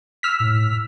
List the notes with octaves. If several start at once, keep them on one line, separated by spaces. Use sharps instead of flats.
E6 F6 B6
A2